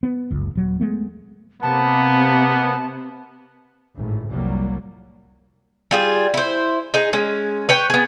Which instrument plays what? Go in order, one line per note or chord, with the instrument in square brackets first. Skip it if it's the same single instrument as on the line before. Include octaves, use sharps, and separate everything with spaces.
[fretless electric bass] B3
F#1 C#2
D#1 F#3
G#3 A3 B3
[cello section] C3 [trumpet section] A#3 B3 [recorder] A5
[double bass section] G#1 A2
F1 C2 F#3 G3 A#3
[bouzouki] G3 F4 G#4
E4 C5
D#4 G#4
G#3 C#4
B4 C#5 G5
B3 G#4